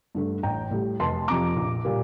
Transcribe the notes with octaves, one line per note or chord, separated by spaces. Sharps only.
G2 D3 A3
A1 G5 A#5
A2 G3
F1 A5 C6
F2 C3 F3 A#5 D6
A#1
A#2 G3 A#3